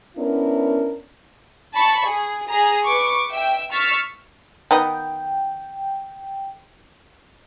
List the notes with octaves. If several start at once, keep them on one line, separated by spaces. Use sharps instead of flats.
B3 C#4 D4 E4 A#4
A5 B5 C#6
G#4
G#4 A#5
B4 C#6 D6
E5 G5 E6
C#6 E6 F6 A6 B6
D#3 B3 D#4 G5